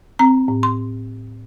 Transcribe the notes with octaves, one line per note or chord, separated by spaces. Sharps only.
C4 A#5
A2
C6